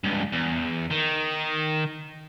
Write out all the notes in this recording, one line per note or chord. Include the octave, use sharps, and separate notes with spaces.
C#2 G2
E2
D#3